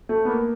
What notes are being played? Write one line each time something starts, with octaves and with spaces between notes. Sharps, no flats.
A3
B3
A#3